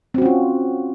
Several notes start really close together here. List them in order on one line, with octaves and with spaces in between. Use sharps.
C4 F#4 C#4 F4